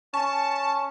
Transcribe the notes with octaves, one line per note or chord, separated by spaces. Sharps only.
C#4 A5 C#6